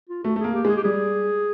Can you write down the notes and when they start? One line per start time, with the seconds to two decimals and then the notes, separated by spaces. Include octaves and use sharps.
0.09 F4
0.23 A3 F#4
0.36 A3
0.39 A#3 G#4
0.54 G4
0.65 G#3 G#4
0.77 G4
0.84 G3 G#4